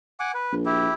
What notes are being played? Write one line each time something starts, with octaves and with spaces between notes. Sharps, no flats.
F#5 G#5 D6
B4
A#1
E4 G4